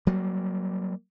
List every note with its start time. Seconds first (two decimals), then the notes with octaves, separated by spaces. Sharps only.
0.07 F#3 G3 A#3